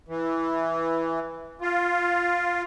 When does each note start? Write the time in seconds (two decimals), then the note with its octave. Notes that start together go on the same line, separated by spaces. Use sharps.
0.08 E3
1.61 F4